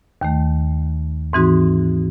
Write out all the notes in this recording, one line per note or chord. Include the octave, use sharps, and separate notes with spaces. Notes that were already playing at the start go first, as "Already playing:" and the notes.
D#2 D#3 A3
G#2 E3 C4 D#4 F#4